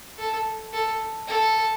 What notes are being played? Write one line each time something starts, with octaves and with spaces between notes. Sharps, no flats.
A4
A4
A4